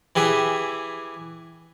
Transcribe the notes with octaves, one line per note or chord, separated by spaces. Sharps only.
E3 G4 G#4 E5